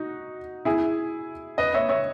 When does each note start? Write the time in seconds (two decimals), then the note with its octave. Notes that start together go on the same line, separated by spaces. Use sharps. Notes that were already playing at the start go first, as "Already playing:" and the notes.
Already playing: D#4 F#4
0.65 E4 G#4
1.58 B4 D#5
1.74 C#5 E5
1.89 C#5 E5